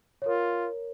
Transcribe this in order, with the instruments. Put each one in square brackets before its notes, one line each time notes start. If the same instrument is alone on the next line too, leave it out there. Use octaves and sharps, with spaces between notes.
[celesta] C#5
[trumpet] F4 [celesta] A#4